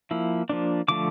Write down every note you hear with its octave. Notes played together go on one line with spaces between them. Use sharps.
F3 A#3 E4
F3 A#3 D4
D3 F3 A3 D4 D6